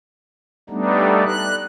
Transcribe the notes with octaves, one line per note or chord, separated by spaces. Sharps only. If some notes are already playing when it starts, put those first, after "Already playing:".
G3 A3 B3 D4 D#4
F#6